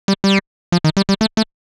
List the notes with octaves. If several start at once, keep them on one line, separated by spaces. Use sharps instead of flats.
G3
G3
F3
D#3
G3
G3
A3
A3